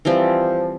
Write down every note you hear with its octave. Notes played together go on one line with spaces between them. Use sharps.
E3 F3 G3 C4